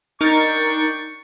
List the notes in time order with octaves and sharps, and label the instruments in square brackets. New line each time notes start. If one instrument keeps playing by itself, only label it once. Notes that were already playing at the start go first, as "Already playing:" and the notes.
[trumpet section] D4 G5 C#6 [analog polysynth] D#4 A#4 A6